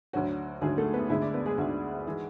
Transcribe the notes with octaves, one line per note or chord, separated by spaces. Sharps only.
D2 D3 F#3 F#4
D2 D3 F#3 G#3 G#4
A3 A4
B3 B4
D2 D3 G#3 E4 E5
D4 D5
B3 B4
G#3 G#4
D2 D3 G#3 F#4
E3 G#3